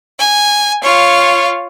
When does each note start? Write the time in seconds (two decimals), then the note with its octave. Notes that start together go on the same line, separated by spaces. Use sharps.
0.19 G#5
0.82 F4 C#5 F5